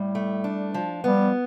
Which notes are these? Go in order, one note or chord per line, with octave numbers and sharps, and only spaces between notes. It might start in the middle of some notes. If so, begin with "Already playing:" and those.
Already playing: A2 G3
A3
D4
F3
G3 B3